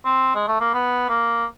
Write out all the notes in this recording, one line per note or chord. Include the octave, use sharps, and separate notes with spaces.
C4
G#3
A3
A#3
B3
A#3